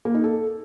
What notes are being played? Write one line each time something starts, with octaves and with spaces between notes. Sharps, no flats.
A#3
D#4
A4